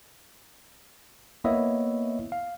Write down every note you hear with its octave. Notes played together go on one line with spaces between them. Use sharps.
A#3 B3 E4 C#5 D#5 E5
F5